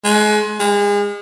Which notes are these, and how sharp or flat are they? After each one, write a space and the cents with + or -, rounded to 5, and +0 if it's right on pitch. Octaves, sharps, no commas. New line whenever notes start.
G#3 +30
G#3 -35